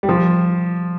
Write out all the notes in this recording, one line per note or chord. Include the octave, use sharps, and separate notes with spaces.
G3
F3